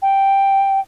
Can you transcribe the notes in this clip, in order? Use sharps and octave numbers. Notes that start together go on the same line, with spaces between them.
G5